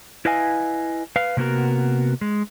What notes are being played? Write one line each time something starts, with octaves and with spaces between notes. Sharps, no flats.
E4 B4 D#5 F5 G#5
B4 F5
C3 A#3 B3 F#4 A#4
G#3